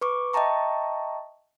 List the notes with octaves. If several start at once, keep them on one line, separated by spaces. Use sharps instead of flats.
B4 C#6 D6
D#5 E5 G5 A5 A#5 C#6